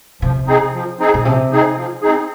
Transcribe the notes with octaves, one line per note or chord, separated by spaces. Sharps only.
C3 F3
C4 D#4 G#4
F3
C4 D#4 G#4
A#2
C3 F3
C4 D#4 G#4
F3
C4 D#4 G#4